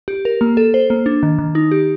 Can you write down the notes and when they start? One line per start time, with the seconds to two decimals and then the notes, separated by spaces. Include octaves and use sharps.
0.08 G4
0.25 A#4
0.41 A#3
0.57 A4
0.74 C5
0.90 A#3
1.06 D4
1.23 D#3
1.39 D#3
1.55 D#4
1.71 G4